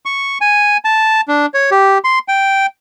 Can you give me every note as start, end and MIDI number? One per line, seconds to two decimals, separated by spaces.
0.06 0.38 85
0.41 0.77 80
0.85 1.21 81
1.28 1.46 62
1.54 1.70 73
1.71 1.98 67
2.04 2.19 84
2.28 2.66 79